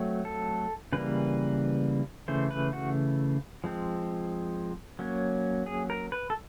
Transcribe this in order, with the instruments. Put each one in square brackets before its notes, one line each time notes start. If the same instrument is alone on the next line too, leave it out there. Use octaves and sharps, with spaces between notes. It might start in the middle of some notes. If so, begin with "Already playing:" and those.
Already playing: [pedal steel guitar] F#3 A3 C4
A4
C#3 E3 G3 A#3 B4
C#3 E3 A3 C5
B4
F#4
F3 G#3 C4
F#3 A#3 C#4
G#4
A#4
B4
A4